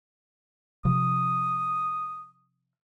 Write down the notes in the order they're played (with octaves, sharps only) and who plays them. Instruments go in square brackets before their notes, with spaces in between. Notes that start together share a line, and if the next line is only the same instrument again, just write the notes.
[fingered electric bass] C3 F3 [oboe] D#6